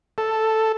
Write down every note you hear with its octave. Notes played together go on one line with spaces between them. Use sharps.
A4